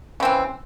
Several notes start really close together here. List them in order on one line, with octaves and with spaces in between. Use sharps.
C#3 C4 E3